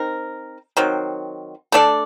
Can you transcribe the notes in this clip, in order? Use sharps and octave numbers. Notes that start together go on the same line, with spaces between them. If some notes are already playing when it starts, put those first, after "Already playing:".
Already playing: C4 D#4 A#4
D#3 F#3 C4
A3 D4 A4 D5